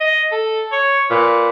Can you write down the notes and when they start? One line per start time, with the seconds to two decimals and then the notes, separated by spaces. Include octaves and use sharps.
0.01 D#5
0.32 A4
0.72 C#5
1.11 A#2 B4